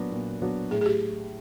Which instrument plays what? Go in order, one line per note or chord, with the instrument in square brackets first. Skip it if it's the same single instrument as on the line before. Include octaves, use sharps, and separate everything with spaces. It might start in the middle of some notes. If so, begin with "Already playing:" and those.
Already playing: [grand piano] A#2 F#3 B3 D4 F#4
A#2
F#3 B3 D4 F#4
[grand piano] A2 [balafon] G#4
[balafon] G#4
G4